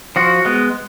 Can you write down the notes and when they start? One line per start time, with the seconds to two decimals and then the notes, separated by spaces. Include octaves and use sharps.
0.16 F3 F#4
0.45 G#3 B3